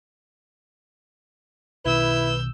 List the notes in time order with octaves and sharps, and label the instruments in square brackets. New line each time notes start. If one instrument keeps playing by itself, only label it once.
[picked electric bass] B1 B2 D#3 [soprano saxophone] E4 [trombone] B4 [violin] E6 G6